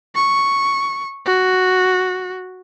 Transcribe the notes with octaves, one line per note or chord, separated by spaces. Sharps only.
C#6
F#4